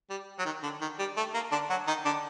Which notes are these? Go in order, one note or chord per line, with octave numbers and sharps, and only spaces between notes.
G3
F#3
D#3
D3
D#3
G3
A3
A#3
D3 D4
F#3 F#4
D#3 D#4
D3 D4